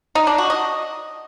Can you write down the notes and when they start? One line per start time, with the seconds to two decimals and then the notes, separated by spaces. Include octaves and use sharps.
0.15 D#4
0.27 D4
0.38 F#4
0.50 D#5